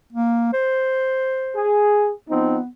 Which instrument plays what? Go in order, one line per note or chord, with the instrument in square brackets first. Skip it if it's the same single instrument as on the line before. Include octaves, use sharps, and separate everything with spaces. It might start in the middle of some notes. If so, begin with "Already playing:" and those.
[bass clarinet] A#3
C5
[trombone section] G#4
[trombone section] F3 C4 D#4 [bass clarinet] B3